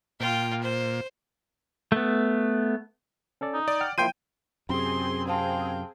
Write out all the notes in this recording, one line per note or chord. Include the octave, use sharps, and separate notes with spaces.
A#2 F4 G5
C5
A3 B3
C#4 A4 D5
D#4
D5 D#6
F#5 G5 F6
F3 A#3 E4 G5 C6 G6 D#7
F#2 C3 C4 G#4 C6
C5 F5 G5 A5 C6